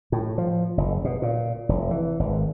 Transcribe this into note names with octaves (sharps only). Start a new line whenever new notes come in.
A2
F3
F#1
B2
A#2
F1
E3
G#1